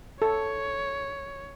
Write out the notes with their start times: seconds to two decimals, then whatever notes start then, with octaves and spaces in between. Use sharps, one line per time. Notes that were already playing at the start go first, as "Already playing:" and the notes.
0.22 A4 C#5